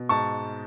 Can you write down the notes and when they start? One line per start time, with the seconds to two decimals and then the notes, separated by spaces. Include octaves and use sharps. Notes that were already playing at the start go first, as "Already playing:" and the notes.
Already playing: B2
0.09 G#2 A5 C#6